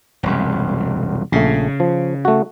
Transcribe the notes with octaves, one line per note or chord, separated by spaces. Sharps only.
E1 C2 F#2
A#1 C#3 A3
F3
A3 F#4